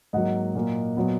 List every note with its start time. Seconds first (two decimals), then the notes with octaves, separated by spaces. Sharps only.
0.13 G#2 F#3 A#3 D#5 F#5
0.55 A#2 F#3 A#3
0.97 A#2 F#3 B3